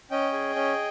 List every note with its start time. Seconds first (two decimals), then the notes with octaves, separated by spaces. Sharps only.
0.11 C#4 D#5 G5
0.33 G#4
0.56 C#4